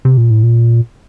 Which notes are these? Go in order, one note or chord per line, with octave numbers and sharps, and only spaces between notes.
C3
A#2
A2
A#2